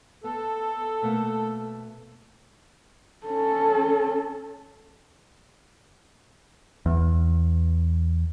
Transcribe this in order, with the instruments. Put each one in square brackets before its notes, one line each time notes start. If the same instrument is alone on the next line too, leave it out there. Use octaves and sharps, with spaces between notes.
[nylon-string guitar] B3 [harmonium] A4
[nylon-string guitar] B2 A3 A#3
[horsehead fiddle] C#4 A4
[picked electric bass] E2